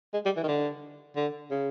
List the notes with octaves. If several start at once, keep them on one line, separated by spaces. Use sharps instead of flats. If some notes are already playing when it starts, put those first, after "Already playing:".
G#3
G3
E3
D#3
D3
D3
C#3